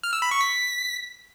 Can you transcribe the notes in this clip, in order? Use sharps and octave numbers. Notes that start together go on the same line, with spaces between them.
F6
E6
B5
C#6
B6